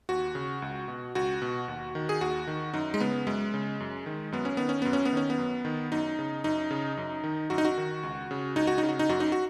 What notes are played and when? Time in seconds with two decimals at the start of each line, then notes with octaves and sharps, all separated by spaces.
0.09 D#2 F#4
0.35 C#3
0.62 C#2
0.88 B2
1.15 C#2 F#4
1.42 B2
1.68 D#2
1.95 D#3
2.09 G#4
2.21 D#2 F#4
2.47 D#3
2.74 F#2 D#4
2.94 G#3
3.00 C#3 B3
3.27 F#2 G#3
3.54 C#3
3.80 F#2
4.06 D#3
4.32 F#2 B3
4.45 C#4
4.57 D#3 B3
4.69 C#4
4.82 F#2 B3
4.93 C#4
5.05 B3
5.13 D#3 C#4
5.30 B3
5.38 F#2
5.65 D#3
5.92 F#2 D#4
6.19 C#3
6.44 F#2 D#4
6.71 C#3
6.97 F#2
7.24 D#3
7.50 F#2 F#4
7.58 D#4
7.65 F#4
7.78 D#3
8.03 C#2
8.31 C#3
8.56 C#2 D#4
8.67 F#4
8.78 C#3 D#4
8.89 F#4
8.99 D#4
9.09 F#2 F#4
9.20 D#4
9.32 F#4